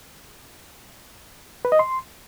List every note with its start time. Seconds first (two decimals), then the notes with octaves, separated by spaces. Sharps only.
1.65 B4
1.72 D#5
1.79 C6